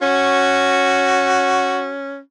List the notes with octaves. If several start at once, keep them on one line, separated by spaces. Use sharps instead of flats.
C#4 F#4